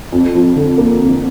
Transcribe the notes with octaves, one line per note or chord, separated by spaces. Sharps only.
F2
F3
D3
A#3
F2